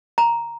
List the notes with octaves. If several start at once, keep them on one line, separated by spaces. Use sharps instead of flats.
A#5